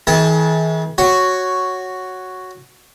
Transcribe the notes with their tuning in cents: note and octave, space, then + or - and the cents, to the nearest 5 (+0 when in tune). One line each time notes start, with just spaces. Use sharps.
E3 -40 G#4 +35 A5 +0
F#4 +0 C#5 +0